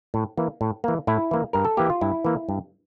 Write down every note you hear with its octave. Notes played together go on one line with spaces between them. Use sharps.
A2
E3 A#3
A2
E3 A#3
A2 E4
E3 A#3
G2 A#4
A4
E3 A#3 G4
F4
G2 E4
E3 A#3
G2